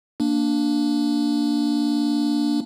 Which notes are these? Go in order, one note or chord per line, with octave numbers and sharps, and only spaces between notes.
A#3 D4